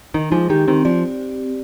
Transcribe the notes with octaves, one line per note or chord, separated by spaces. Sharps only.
D#3 D#4
F3 G#3
D#3 G4
D#3 C4
F3 D5